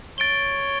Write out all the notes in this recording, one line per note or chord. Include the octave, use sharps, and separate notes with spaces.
C#5 A6 D7 G7